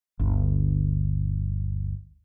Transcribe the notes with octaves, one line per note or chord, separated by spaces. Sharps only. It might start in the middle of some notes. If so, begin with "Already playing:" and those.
G1 D2